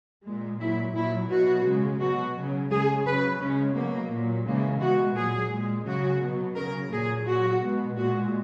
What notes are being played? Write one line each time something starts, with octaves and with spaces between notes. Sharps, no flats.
A#2 G#3
A#2 F#3 E4
A#2 F#3 E4
B2 F#3 F#4
C#3 G#3
B2 F#3 F#4
C#3 F#3
C#3 G#3 G#4
C#3 F#3 B4
C#3 G#3 C#4
B2 F#3 A#3
A#2 F#3
C#3 E3 G#3 A#3
B2 G#3 F#4
A#2 F#3 G#4
A#2 G#3
C#3 F#3 F#4
B2 F#3
C#3 F#3 A#4
A#2 F#3 G#4
A#2 F#3 F#4
B2 G#3
A#2 G#3 F#4